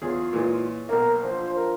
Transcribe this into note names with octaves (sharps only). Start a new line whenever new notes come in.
E2 F4 G#4 C#5
A#2 E3 G#3
B1 A#3 A#4
F3 D4 C5
A#4